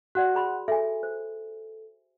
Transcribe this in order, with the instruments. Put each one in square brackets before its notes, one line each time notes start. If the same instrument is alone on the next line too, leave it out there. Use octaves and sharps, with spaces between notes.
[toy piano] F#4 D5 [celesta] F#5 F#6
[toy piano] G#4 B5 C6
[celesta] A4 [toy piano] E5 G#5
[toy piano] C5